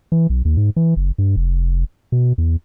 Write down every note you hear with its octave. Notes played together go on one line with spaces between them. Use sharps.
E3
B1
D#2
G#2
E3
F#1
G2
F1
B2
E2